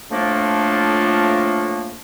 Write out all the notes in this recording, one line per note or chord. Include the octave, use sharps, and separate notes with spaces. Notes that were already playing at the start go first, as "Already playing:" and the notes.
F2 A2 F3 A3 A#3 D4